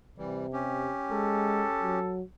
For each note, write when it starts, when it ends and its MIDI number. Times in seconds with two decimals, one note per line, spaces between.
0.18 0.91 48
0.18 0.46 52
0.18 0.46 55
0.53 1.99 61
0.53 1.99 67
1.11 1.65 56
1.11 2.15 69
1.82 2.22 54